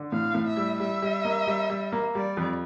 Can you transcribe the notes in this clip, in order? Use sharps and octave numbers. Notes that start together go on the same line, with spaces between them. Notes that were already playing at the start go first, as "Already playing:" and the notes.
Already playing: D3
A2 F5
A2
E5
G3
G3 E5
G3
A#3
G3
G3
A#3
G3 D5
F2